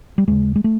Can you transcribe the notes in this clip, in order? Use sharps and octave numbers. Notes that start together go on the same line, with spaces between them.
G3
D#2 C#3 G#3
G#3
A3